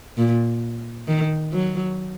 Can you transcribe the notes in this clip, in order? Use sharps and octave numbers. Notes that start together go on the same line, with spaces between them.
A#2
D#3
F#3